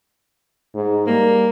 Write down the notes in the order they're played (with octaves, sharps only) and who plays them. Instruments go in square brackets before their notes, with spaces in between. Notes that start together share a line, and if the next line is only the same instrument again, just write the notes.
[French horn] G#2
[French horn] G3 [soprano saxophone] A#3